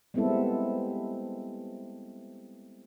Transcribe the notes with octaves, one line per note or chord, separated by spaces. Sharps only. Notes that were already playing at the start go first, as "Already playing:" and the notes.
G3 G#3 B3 C4 E4 A4